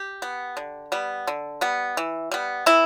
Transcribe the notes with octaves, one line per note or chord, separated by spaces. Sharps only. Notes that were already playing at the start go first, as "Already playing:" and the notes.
Already playing: G4
B3
D3
G3 B3
D3
G3 B3
E3
G3 B3
E3 E4